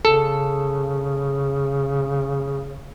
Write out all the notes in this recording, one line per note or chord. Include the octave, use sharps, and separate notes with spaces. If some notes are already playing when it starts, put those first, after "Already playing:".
C#3 A4